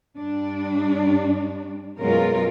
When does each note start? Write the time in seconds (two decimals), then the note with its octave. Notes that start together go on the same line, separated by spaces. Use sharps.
0.19 G2 G3 D4
2.00 F#2 B2 G#3 C#4 F4 A#4